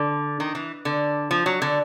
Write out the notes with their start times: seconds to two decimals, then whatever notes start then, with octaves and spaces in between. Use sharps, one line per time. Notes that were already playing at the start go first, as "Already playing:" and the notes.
Already playing: D3
0.40 D#3
0.55 E3
0.85 D3
1.31 F3
1.46 F#3
1.62 D3